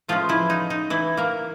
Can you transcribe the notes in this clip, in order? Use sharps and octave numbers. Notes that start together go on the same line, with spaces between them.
A2 E3 F3 G#3 C#4 F4
E3 E4
D#4
D#4
E3 E4
A#3 A#4